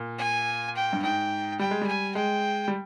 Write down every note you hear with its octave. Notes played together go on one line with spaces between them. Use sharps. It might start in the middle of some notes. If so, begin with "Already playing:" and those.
Already playing: A#2
G#5
G5
G2
G#2 G5
G3 G5
G#3
G3
G#5
G#3 G5
G3